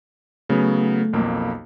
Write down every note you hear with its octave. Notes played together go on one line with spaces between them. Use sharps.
C#3 F#3 A3 B3
B1 F2 A#3